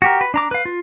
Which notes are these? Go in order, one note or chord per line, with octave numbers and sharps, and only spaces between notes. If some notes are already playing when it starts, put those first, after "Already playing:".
F#4 G4 A#4
B4
D4 A#5 D6
B4 F5
F4